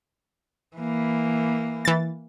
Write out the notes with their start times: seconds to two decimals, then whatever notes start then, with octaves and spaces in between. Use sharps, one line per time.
0.77 E3 A#3
1.85 E3 A6